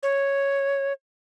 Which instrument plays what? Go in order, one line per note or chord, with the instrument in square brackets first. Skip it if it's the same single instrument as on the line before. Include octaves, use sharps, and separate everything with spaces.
[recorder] C#5